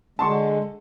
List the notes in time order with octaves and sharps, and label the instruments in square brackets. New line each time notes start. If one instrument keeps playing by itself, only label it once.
[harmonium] D3 G#3 [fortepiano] A5 C6 C#6